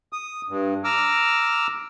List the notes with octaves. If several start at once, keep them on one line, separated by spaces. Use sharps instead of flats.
D#6
G2
A#5 D6 E6 F6